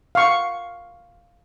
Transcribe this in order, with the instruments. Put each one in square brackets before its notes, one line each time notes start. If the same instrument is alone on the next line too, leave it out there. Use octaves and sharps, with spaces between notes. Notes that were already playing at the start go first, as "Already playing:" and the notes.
[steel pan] F5 C#6